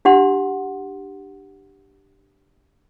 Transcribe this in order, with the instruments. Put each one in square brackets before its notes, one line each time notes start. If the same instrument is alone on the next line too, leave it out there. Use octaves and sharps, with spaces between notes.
[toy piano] D4 G4 F#5 C6